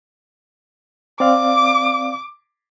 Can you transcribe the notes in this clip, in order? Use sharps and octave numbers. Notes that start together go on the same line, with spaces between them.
C4 D5 F5 D6